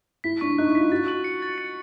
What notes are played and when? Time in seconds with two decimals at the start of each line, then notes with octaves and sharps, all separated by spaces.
0.24 E4 B6
0.41 D4 C#6
0.58 D#4 F#6
0.69 E4
0.75 B6
0.80 F4
0.92 F#4 A6
1.08 F#7
1.24 C#7
1.42 A6
1.58 C#7